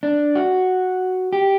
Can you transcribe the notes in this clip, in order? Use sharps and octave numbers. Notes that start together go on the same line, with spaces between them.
D4
F#4
G4